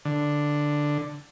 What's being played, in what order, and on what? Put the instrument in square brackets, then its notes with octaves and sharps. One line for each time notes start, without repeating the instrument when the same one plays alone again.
[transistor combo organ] D3